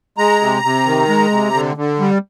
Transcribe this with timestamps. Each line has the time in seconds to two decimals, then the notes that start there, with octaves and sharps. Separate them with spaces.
0.18 G#3 A#5
0.41 C3
0.64 C3
0.86 D#3
1.09 G#3
1.31 C3
1.54 D3
1.77 D3
2.00 G3